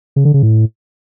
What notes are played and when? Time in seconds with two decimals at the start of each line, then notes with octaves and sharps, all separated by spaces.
0.16 C#3
0.25 D3
0.34 C#3
0.43 A2